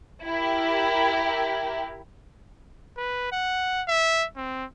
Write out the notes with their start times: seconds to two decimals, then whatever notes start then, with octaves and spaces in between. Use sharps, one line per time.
0.25 E4 G4 A#4
2.98 B4
3.32 F#5
3.88 E5
4.36 C4